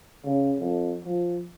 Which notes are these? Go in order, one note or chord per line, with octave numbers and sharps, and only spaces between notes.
C#3
F2
F3